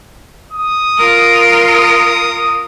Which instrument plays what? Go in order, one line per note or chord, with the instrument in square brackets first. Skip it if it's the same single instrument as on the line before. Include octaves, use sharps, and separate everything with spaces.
[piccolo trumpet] D#6
[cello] F4 A#4
[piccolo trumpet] D#6